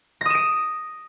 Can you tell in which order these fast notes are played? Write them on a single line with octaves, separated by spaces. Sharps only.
A#6 D#6 E7 D7